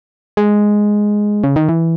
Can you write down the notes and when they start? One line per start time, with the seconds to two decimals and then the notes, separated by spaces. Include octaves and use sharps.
0.37 G#3
1.44 C#3
1.56 D#3
1.69 E3